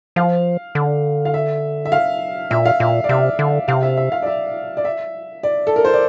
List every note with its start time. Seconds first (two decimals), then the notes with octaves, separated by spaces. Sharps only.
0.16 F3 F5
0.75 D3
1.25 F5
1.34 E5
1.85 E5
1.92 F5
2.51 A#2 E5
2.66 F5
2.80 A#2 E5
3.04 D5
3.09 C3 E5
3.39 D3
3.68 C3 F5
3.83 E5
3.97 E5
4.12 F5
4.22 D5
4.26 E5
4.77 D5
4.85 E5
5.43 D5
5.67 A4
5.76 A#4
5.85 C5
5.94 D5